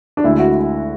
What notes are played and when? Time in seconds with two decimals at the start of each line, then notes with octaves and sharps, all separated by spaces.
0.17 D4
0.24 D2 D3 G#3 E4
0.39 F#4